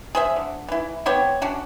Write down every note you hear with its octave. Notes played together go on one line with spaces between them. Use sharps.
G#4 C5 E5
D3
E3 E4
B3 C4 G4 C#5
C#4 D4 F#4